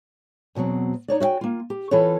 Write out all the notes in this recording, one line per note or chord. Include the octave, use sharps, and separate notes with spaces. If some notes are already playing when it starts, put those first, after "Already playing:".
E2 B2 E3 F#3 C4
D#4 C#5 D5
F#4 E5 F5 G5 G#5
A#3 F4
G4
E3 C4 F4 A4 B4 C#5